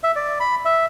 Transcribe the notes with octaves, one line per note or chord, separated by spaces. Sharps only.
E5
D5
B5
E5